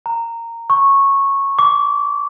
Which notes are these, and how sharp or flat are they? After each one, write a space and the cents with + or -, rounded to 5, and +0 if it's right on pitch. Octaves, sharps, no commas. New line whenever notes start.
A#5 -15
C#6 -10
D6 -30